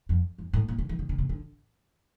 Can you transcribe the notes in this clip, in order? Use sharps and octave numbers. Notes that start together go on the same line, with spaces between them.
F2
F2
A2
A#2
D3
E3
D3
D3
C3
D3